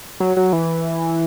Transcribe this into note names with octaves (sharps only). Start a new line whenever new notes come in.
F#3
F#3
E3